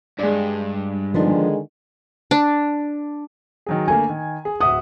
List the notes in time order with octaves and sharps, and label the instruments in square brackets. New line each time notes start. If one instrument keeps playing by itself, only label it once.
[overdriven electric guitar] G2 [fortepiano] G#3 D5
[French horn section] D3 D#3 G#3 [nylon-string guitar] F3 B3 D4
[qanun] D4
[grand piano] D#3 F#3 G#4
[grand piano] D3 A3 A#3 [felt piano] G#5
[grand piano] D#3
G#4
[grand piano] D1 E5 F#5 [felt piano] D#6